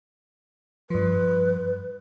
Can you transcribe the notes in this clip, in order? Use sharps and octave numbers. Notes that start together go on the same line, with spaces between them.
G2 F3 B4